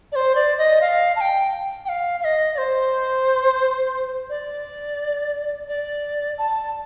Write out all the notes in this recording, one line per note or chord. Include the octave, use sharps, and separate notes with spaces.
D5
C5
D5
D#5
F5
A5
G5
G5
F5
F5
D#5
D5
C5
D5
D5
A5